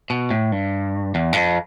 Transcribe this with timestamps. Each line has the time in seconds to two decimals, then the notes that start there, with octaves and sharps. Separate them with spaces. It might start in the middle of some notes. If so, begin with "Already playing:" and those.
0.10 B2
0.30 A2
0.52 G2
1.15 E2
1.33 G2
1.36 F2